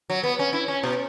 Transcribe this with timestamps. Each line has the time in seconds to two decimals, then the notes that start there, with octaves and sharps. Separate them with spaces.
0.10 F#3
0.23 B3
0.39 C#4
0.53 E4
0.68 C#4
0.83 B2